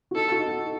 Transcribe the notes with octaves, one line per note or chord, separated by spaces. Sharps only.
F#4
D#4 A4
F#4
D#4